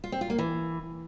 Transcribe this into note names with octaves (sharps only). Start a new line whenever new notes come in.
F4
C4
F4
A#3
E3